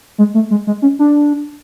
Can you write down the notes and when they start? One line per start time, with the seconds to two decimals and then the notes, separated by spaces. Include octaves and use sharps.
0.18 G#3
0.34 A3
0.51 G#3
0.67 G#3
0.82 C#4
0.99 D4